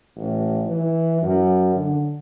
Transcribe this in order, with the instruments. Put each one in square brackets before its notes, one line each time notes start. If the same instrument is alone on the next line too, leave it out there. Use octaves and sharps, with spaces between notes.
[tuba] A1
E3
F#2
D3